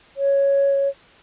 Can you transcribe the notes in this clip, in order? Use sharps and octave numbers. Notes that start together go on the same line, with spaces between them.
C#5